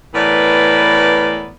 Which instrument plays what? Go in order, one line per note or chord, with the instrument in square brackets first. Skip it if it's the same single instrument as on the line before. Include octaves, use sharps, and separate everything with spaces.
[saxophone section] A2 E3 B3 A#4 B4 D5